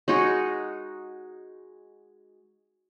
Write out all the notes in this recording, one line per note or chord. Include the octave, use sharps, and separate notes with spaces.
G#3 D#4 F#4